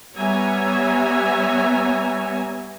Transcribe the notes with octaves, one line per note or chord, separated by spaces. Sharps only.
G3 B3 C#5 E5 G#5 A#5